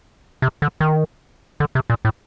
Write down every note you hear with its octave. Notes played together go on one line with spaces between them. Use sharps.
C3
D3
D#3
D3
C3
A#2
A2